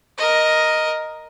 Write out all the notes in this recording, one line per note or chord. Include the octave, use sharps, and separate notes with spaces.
A#4 D#5